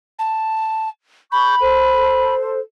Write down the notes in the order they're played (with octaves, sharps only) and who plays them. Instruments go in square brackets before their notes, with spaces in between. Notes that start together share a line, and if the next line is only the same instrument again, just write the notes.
[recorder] A5
[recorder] B5 [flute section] C#6 G6
[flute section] A4 C5